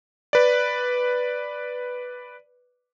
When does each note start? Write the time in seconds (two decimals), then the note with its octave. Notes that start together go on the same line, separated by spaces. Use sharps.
0.33 B4 D5